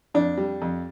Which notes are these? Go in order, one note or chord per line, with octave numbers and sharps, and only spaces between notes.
F2 D4
G3
F2